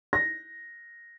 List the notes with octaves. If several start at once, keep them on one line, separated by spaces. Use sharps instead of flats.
A#6